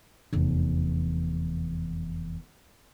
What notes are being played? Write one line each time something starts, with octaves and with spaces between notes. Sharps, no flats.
F1 E2